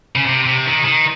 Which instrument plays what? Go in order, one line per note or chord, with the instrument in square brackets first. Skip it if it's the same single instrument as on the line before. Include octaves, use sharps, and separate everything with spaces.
[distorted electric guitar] C#3
C3
C3
D#3
D#3